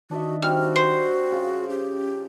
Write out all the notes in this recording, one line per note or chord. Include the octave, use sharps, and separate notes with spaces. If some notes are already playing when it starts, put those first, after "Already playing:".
D#3 D4 F#4 D#5 E5
G3 C4 F#4 F6
C5
C#3 F4
C#4 G4